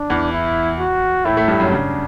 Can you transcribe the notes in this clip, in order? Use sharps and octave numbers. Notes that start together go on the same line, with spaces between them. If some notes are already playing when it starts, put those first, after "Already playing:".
Already playing: D4
E2 E3
E4
F#4
A2 A3 E4
A2 A3
G2 G3
F#2 F#3
C#3 D4